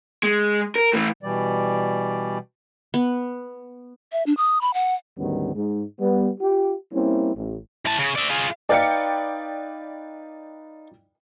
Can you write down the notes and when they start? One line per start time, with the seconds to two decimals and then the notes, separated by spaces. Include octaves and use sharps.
0.23 G#3
0.76 A#4
0.93 A2 E3
1.23 B2 E3 G3 D5
2.94 B3
4.12 E5
4.26 D4
4.37 D#6
4.61 B5
4.74 F#5
5.17 D2 G#2 D#3 G3 B3 C#4
5.54 G#2
5.99 G3 B3
6.41 F4 G4
6.92 G3 A#3 C4 C#4 E4
7.35 A1
7.86 E3 A5
7.99 C#3
8.16 D5 E5
8.31 F4 G#4
8.69 D#4 B4 D5 F5 G5 C#7